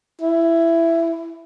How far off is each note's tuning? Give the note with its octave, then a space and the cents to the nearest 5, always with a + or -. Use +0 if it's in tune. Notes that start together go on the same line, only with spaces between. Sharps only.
E4 +10